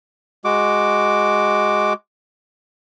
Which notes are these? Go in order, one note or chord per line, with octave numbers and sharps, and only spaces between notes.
G#3 F#4 D6